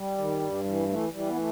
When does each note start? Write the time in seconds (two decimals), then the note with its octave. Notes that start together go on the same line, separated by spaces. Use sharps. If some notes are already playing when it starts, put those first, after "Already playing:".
Already playing: G3
0.18 D#3
0.42 G2
0.65 E3
0.88 E3 A3
1.12 E3 G3
1.27 B3
1.36 A3